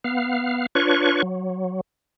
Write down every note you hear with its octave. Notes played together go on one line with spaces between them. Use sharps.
B3 F5
D4 F4 B4 C#5 C#6
F#3